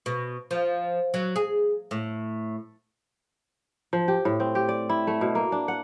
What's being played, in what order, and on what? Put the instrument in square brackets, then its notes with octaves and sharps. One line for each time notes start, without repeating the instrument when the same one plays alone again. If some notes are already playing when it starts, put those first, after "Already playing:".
[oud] B2
F3
F#3
G#4
A2
[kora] F3
G4
A2
C4
G4
D5
E4
A3
B2
A#3
D4
F#5